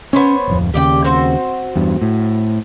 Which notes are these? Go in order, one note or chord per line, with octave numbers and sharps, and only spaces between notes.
B3 C#4 C5 C#5
D1 F2
D#2 C#3 G4 D5 G5
C4 F#4 C5
E2 G2
A2